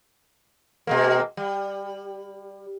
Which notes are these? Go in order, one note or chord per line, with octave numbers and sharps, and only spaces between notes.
B2 G#3 A#3
G3